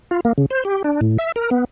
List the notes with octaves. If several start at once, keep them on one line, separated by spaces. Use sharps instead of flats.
F4
A#3
C#3
C5
G4
D4
A2
E5
A#4
B3